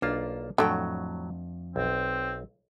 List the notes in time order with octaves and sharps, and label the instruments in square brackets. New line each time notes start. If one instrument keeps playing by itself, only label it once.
[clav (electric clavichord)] B1 A#3 F4 [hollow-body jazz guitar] D4
[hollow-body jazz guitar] F2 G5 [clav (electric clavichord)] A2 F#3 [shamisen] D3 A3
[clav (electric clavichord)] B1 [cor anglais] C4